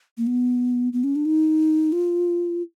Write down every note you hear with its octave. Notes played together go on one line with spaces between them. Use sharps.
A#3
B3
B3
C#4
D4
D#4
F4